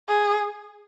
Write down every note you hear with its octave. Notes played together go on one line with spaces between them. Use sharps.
G#4